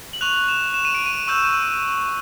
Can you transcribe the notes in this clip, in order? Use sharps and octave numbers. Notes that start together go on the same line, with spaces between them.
F#7
C#6 F#6 F7
E7
E7
D#7
D7
D#7
C#6 E6 G6 E7